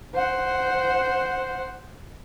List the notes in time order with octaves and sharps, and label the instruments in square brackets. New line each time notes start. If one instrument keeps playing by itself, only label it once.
[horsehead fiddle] C5 F#5